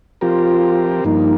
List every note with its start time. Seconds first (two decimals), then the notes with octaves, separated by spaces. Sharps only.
0.21 F3 C4 F4 G4 A#4
1.04 G2 F3 A#3 D#4